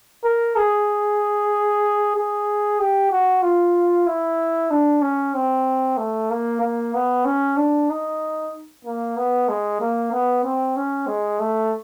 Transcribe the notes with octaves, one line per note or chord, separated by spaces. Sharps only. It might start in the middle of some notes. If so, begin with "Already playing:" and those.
A#4
G#4
G#4
G4
F#4
F4
E4
D4
C#4
C4
A3
A#3
A#3
B3
C#4
D4
D#4
A#3
B3
G#3
A#3
B3
C4
C#4
G#3
A3